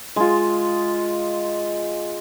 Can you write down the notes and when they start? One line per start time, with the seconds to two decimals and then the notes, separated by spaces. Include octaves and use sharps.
0.16 G#3 F4